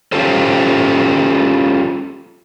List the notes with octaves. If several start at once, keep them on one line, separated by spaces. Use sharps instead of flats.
C#4 D#4 F4 G4 A4 C5